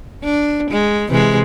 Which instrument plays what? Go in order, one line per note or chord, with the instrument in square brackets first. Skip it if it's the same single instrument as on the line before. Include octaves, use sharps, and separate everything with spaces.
[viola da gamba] D4
G#3
C3 E3 G#3